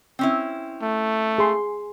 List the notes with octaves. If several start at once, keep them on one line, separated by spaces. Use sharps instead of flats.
C4 C#4 E4
A3
G#4 C6